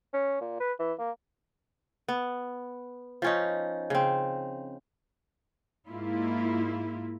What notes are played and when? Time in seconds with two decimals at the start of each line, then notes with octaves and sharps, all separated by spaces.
0.14 C#4
0.41 A#2
0.60 B4
0.79 E3
0.99 A#3
2.08 B3
3.22 F3 C#4 D#4
3.90 C#3 C4
5.88 G#2 A#3 E4 F4